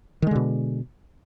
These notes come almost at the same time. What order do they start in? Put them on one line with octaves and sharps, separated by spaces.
D#3 G#3 D3 B2